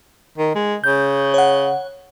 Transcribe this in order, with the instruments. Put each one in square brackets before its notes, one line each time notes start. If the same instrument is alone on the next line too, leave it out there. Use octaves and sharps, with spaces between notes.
[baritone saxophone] D#3
G#3
[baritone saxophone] C#3 [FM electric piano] G6
[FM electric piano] C#5 F#5